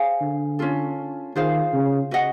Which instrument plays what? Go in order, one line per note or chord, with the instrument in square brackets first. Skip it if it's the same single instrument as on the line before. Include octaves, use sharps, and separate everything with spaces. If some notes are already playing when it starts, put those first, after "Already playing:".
Already playing: [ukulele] G#4 C5 F5 G#5
[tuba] D3
[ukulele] C#4 F4 A4
[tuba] D#3 [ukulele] F4 G#4 C5 F5
[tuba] C#3
[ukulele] F#4 B4 D#5 F#5